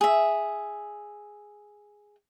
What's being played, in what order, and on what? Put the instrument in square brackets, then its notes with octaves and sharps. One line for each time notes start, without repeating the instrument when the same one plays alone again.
[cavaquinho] G#4 E5